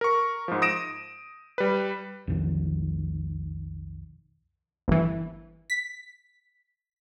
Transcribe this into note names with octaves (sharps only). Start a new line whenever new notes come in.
A#4 C#6
G#2 F3
D#6 A#6 D7 E7
G3 B4
B1 F2 D#3 F3
G1 E3
B6